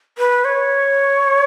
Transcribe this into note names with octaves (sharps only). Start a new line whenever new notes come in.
B4
C#5